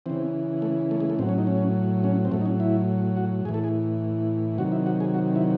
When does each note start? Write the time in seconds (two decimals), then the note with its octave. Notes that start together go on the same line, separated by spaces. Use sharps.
0.06 C#3 E3 C4
0.62 A3
0.91 A3
1.00 G#3
1.10 A3
1.19 A2 C4
1.22 F#3
1.29 C#4
1.38 D#4
1.47 C#4
2.04 C#4
2.25 C4
2.31 A2 F#3 A3
2.41 D#4
2.46 C#4
2.60 E4
3.17 F#4
3.45 A2 E3 G#4
3.54 A4
3.64 G#4
4.58 C3 D#3 F#3 F#4
4.72 E4
4.86 F#4
5.00 G#4
5.14 F#4
5.36 E4